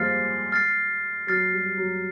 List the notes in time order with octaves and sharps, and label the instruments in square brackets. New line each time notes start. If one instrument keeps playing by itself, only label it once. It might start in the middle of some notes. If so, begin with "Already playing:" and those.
Already playing: [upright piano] F3 G3 G#3 A#3 [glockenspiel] F6 A6 C7
[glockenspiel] F6 A6 C7
[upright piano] F#3 [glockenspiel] F6 A6 C7
[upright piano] G3
F#3